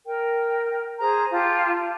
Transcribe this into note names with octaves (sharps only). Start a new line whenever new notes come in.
A#4 G5
G#4 C5 A#5
F4 G4 A5